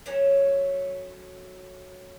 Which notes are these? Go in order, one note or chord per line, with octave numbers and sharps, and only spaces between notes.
F#3 A3 C#4